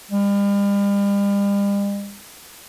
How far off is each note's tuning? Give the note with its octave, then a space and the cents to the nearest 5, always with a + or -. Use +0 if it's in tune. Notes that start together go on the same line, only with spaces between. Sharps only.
G3 +45